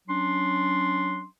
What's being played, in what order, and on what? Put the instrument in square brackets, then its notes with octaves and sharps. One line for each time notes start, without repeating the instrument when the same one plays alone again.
[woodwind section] F#3 C#4 D4 C6